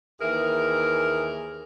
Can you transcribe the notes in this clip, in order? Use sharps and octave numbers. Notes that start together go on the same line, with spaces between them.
D#2 E3 G#4 A#4